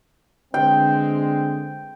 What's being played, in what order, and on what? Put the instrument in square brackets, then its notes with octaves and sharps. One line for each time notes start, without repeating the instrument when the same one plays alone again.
[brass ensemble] D3 G#3 C4 [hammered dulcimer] G5